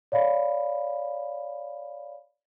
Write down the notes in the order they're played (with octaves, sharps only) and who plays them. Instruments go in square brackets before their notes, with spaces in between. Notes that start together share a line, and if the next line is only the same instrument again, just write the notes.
[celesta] C#5 D5 F5 B5